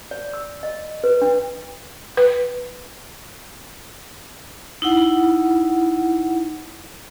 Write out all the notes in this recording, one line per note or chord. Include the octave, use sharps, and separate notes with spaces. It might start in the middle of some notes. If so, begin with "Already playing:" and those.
D5
E6
D#5
B4
D4
B4
D#4 E4 F#5